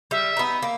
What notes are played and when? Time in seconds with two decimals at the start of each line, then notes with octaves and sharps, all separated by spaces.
0.11 G3 E5
0.37 B3 D#4
0.62 A#3